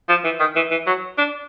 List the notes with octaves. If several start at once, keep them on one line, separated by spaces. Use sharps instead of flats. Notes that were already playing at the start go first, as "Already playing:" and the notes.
F3
E3
D#3
E3
E3
F#3
D4